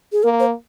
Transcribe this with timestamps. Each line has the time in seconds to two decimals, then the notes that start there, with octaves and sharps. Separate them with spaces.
0.12 G#4
0.23 A#3 A#4
0.40 C5